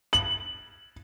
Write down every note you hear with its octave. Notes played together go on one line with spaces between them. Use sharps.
F#7